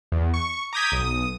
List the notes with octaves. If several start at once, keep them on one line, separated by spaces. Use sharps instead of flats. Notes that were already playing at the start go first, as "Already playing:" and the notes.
E2
C#6
A#5 D6 D#6 G6 G#6 B6
B1 D#6